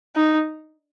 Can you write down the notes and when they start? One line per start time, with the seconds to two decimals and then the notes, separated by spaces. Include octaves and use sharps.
0.16 D#4